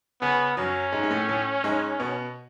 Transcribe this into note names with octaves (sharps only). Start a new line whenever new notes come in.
C#3 B3 C#4
F#2 F#3 C#4
G#2 G#3
G#3
A2 A3
A2 A3
G#2 G#3
B2 B3